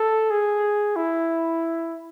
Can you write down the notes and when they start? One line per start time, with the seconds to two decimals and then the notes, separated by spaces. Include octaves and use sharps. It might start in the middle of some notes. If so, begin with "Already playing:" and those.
Already playing: A4
0.30 G#4
0.96 E4